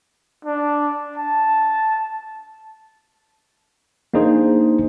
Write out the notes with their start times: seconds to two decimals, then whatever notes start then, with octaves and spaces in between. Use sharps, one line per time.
0.45 D4
1.18 A5
4.14 A#3 D4 D#4 G#4 C5